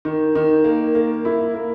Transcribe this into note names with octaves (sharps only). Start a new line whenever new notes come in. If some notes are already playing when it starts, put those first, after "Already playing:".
D#3
D#3
A#3
A#3
E4
A#3